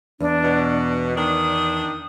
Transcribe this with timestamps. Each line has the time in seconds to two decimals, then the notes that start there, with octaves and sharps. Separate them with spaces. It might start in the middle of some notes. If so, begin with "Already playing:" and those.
0.20 E2 D4
0.44 B2
1.16 D#3 D4 D#6